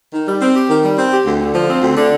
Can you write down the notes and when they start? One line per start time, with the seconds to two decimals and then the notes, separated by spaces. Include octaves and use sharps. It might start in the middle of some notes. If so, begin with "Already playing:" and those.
0.13 D#3
0.27 G3
0.41 C4
0.56 G4
0.69 D#3
0.84 G3
0.97 C4
1.12 G4
1.25 D2
1.41 D3
1.54 F3
1.69 C4
1.82 D2
1.96 D3